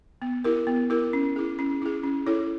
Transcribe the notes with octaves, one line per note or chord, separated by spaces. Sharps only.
B3
E4 G4 A#4
B3
E4 G4 A#4
C#4
E4 G#4
C#4
E4 G#4
C#4
E4 A4 C#5